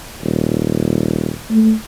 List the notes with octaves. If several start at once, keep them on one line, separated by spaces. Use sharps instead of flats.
D#1
A3